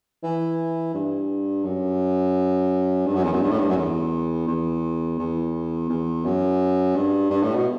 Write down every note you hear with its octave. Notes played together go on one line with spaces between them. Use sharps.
E3
G2
F#2
G2
F#2
E2
F#2
G2
A2
G2
F#2
E2
E2
E2
E2
F#2
G2
G2
A2
B2